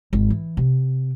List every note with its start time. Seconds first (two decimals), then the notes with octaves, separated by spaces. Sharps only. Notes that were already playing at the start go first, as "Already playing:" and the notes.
0.13 G#1
0.30 E3
0.57 C3